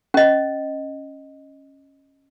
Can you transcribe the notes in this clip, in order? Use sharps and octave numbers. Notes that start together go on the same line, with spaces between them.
C#4 D#5